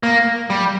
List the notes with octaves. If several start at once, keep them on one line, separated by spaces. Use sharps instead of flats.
A#3
G3